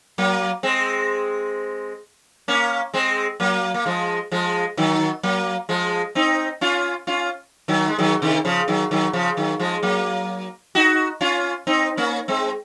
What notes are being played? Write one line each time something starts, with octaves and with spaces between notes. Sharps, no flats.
F#3 A#3
G#3 C4
A#3 C#4
G#3 C4
F#3 A#3
A#3
F3 G#3
F3 G#3
D#3 F#3
F#3 A#3
F3 G#3
C4 D#4
C#4 F4
C#4 F4
D#3 F#3
G#3
D#3 F#3
C3 D#3
C#3 F3
D#3 F#3
D#3 F#3
C#3 F3
D#3 F#3
F3 G#3
F#3 A#3
D#4 F#4
C#4 F4
C4 D#4
A#3 C#4
G#3 C4